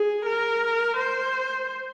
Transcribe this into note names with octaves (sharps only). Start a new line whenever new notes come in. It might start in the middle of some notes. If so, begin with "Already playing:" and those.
Already playing: G#4
A#4
C5